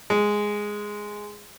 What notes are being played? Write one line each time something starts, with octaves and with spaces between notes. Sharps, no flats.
G#3